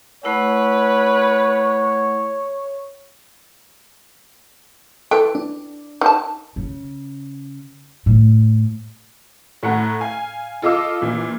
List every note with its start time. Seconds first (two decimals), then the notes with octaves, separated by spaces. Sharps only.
0.24 A3 E4 B4 C#5 F#5
5.11 E3 A4 G5
5.35 D4
6.01 D#4 A5
6.56 C#3
8.06 A2
9.63 A2 A3 F#5 A#5
10.00 F5 G#5
10.62 F4 A4 D#5 F5 D6 E6
11.01 A#1 A#2 E3